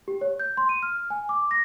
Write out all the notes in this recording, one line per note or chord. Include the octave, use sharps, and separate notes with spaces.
G4
C#5
G6
C6
D#7
F6
G#5
D6
A#6